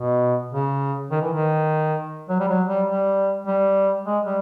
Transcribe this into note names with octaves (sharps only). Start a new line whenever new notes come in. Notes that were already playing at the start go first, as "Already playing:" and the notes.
Already playing: B2
C#3
D#3
E3
D#3
F#3
G3
F#3
G3
G3
G3
G#3
G3